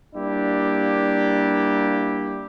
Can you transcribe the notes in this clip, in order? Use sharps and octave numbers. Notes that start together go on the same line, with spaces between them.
G3 A#3 D4 E4 G4